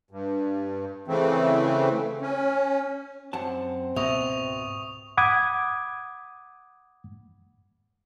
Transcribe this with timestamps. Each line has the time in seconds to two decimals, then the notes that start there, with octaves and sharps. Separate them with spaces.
0.11 G2
1.08 C#3 E3 A3 C4
2.21 C#4
3.33 F#2 C4 F#5 A5
3.96 C#2 G#2 B2 E5 C#6 D#6 F7
5.17 F#5 B5 D6 D#6 G#6